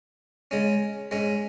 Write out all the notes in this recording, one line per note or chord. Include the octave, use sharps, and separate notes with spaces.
C#3 G#3 C#4
G#2 G#3 C#4